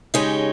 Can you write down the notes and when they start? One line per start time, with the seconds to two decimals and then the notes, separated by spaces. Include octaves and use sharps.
0.14 C#3 G#3 D#4 G4 C#5